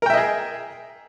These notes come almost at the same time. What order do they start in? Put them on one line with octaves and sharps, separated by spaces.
A#4 G5 E5 D#5 G#4